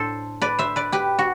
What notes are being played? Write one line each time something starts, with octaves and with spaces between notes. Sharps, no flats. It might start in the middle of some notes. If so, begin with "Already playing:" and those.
Already playing: A2 D4 A4 C5
B4 D5
C5 E5
B4 D5
G4 B4
F#4